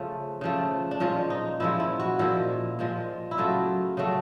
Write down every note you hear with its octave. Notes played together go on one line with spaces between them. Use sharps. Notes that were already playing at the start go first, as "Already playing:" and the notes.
Already playing: C#3 F3 A3 C#4
C#3 F3 A3
D4
A#2 F3 G#3 C#4
D#4
A#2 F3 G#3 E4
E4
F#4
A#2 F3 G#3 E4
A#2 F3 G#3
E4
C#3 F#3 A3 F4
C#3 F#3 A3